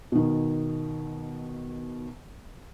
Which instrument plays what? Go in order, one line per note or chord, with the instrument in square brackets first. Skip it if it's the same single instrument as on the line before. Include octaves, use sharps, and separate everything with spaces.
[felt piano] B2 D#3